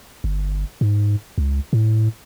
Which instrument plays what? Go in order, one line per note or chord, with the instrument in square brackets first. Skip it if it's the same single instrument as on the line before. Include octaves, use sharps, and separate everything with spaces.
[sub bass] G1
G#2
C#2
A2